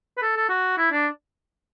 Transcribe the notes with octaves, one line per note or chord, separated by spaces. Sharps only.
B4
A4
A4
F#4
E4
D4